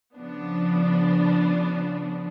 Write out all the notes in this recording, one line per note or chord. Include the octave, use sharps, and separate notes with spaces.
C#3 F3 B3 D4